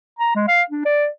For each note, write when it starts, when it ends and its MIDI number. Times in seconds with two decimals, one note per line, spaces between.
0.19 0.33 82
0.35 0.47 56
0.48 0.62 77
0.70 0.85 62
0.85 1.07 74